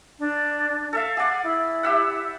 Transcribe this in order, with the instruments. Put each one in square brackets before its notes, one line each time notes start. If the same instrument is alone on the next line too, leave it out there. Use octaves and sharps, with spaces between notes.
[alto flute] D4
[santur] A4 E5 F5
[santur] G#4 D5 [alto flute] F#5
[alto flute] E4
[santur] G4 E5 F#5